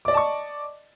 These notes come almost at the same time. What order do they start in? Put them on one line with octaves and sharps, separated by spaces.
D6 D5 D#5 A5 C#6